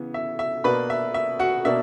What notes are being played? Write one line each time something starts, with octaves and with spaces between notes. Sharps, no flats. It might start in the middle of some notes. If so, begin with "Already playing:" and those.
Already playing: C#3 E3 B3
E5
E5
B2 A#3 D4 B4 B5
E5
E5
F#4 F#5
B2 A#3 D4 E5